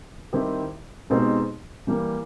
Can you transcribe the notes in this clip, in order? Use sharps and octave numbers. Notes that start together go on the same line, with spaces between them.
D#3 G3 C4 E4 G4
B2 G#3 C4 D#4 G4
E3 G3 A#3